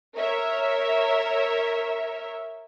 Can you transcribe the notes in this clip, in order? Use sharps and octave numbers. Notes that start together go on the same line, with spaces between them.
A#4 C#5 E5